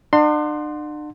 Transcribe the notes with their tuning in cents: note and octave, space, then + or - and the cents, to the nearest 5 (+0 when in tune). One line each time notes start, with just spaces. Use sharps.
D4 +40 F#5 -30 C6 +0